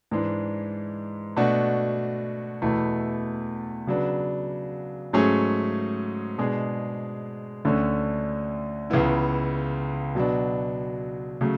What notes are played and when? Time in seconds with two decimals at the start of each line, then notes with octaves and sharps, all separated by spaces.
0.11 G#2 E3 G#3 D4
1.36 B2 A3 D4 F#4
2.62 E2 B2 A3 E4
3.87 C#3 F#3 B3 D4
5.13 G#2 F#3 A3 C#4 G#4
6.38 B2 G#3 D4 G#4
7.65 D2 D3 A3 C#4
8.90 C#2 C#3 E3 B3 E4
10.15 B2 F#3 B3 D4
11.41 C#3 F#3 A3